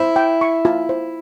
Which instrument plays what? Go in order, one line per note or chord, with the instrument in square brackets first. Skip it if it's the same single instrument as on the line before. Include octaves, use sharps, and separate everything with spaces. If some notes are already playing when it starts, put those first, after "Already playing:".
Already playing: [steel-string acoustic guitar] E4 [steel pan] C5
[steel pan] G5
C#6
F4
C5